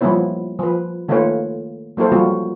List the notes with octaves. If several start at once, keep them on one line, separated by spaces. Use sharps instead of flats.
F3 G3 A#3 B3 E4 C#5
F3 B4
D#3 A3 A#3 F4 B4 C#5
F#3 A#3 E4 A4 C5
F3 G3 B3 F4 F#4